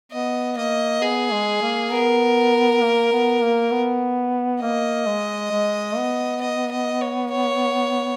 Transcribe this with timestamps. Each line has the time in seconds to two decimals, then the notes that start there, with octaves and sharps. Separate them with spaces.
0.12 B3 D#5
0.57 A#3 D#5
1.01 B3 G#4
1.32 G#3
1.62 A#3
1.91 B3 A#4
2.82 A#3
3.12 B3
3.42 A#3
3.71 B3
4.61 A#3 D#5
5.07 G#3
5.51 G#3
5.97 B3
6.41 D#5
6.71 D#5
7.01 C#5
7.30 C#5